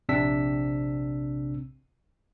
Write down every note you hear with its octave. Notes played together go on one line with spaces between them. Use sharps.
A#1 C3 C4 D4 E6 B6